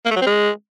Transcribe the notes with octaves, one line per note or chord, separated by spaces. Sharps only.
A#3
A3
F#3
C4
G#3